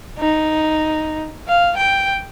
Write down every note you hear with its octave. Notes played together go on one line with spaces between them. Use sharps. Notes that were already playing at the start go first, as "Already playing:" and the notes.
D#4
F5
G5